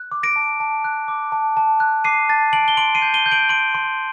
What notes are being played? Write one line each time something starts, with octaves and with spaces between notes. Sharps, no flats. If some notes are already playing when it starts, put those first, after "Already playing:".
Already playing: F#6
D6
A#6 D7
A5
A5
F#6
D6
A5
A5
F#6
D6 C7 D#7
A5 A6
A5 D7 F#7
G7
C6 D7 F#7
C7 D#7
G6
D#7 G7
G6
D7 F#7
C6 D7 F#7
C6